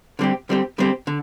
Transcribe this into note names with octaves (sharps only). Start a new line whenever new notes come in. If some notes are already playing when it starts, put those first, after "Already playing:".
D3 G3 C4 G4
D3 G3 C4 G4
D3 G3 C4 G4
D3